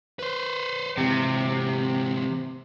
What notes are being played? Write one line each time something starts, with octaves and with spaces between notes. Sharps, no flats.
B4 C5
G#2 C3 E3